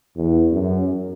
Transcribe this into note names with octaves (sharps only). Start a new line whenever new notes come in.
E2
F#2